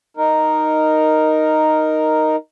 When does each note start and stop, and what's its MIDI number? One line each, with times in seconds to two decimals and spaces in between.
0.17 2.36 63
0.17 2.36 70